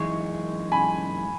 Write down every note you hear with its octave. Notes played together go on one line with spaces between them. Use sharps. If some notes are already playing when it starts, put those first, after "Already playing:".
Already playing: F#2 E3 G#3 D#4 G#4 C#6
G#5 B5